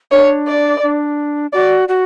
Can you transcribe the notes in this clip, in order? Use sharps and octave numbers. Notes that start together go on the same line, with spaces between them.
D4 C#5
D5
D4
F#4 D5
F#4